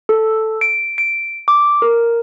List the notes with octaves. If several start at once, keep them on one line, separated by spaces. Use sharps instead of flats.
A4
D7
D7
D6
A#4